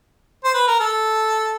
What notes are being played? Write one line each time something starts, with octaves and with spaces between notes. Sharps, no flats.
C5
B4
A#4
A4